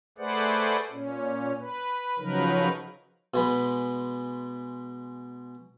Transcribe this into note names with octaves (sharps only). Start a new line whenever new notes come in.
A3 G#4 B4 C5 D5 F#5
A#2 C#4
B4
C#3 F3 F#3 D#4 A#4 B4
B2 G#3 B4